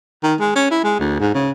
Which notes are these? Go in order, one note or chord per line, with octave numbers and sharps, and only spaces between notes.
D#3
G#3
C#4
E4
G#3
D2
G#2
C#3